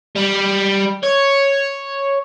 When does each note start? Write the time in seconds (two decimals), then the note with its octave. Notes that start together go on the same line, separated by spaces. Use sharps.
0.15 G3
1.03 C#5